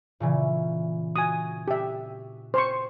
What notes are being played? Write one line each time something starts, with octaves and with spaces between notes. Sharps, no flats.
A#2 C#3 E3
F#4 G#5 D#6
G4 E5
C5 C6 C#6